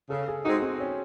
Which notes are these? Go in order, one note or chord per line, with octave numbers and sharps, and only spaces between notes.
C#3 A4
G#4
G#3 C4 D#4 F#4
C4
C#4